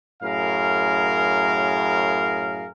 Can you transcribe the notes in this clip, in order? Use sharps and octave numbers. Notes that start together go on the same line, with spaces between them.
F#2 A2 G#4 A#4 F5